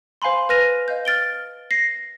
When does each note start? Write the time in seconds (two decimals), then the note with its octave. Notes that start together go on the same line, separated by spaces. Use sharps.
0.22 C5 F5 G#5 B5 C6
0.49 B4 F6 A#6 D#7 F7
0.88 D#5 F5 G6
1.05 F6 A6 D7 G7
1.71 A#6 C7